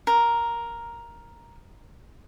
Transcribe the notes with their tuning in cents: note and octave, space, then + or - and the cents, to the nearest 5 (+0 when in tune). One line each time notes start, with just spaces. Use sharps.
A#4 +5